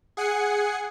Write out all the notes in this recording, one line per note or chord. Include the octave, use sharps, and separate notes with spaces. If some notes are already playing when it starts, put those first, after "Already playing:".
G#4 F#5 G#5 C7 C#7